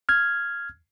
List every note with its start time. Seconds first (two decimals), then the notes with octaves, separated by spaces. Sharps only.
0.09 F6 G#6